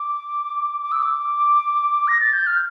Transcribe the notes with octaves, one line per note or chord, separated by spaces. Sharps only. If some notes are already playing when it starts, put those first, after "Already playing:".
Already playing: D6
D6
E6
D6
A#6
A6
G6
F6